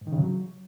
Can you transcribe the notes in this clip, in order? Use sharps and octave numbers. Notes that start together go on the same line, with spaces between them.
G#2
D#3
C#3
F#3